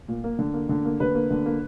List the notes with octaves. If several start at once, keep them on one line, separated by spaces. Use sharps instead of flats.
A#2
A#3
D3
A#3
D3
A#3
D3 B4
A#3
D3
A#3